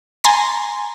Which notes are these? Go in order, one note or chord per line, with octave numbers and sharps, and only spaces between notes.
G#5 A#5 C6 A6 A#6